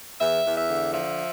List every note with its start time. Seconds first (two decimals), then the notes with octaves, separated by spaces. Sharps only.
0.21 E2 E5
0.45 E2
0.56 E5
0.69 D3
0.93 F3 E5